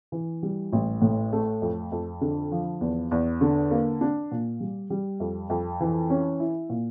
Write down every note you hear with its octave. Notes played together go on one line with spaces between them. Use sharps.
E3
G3
A1
A2
A3
F2
F2
D3
F3
E2
E2
D3
A#3
D4
A#2
G3
G3
F2
F2
E3
C#4
E4
A#2